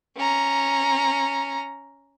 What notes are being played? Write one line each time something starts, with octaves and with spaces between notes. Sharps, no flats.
C#4 A#5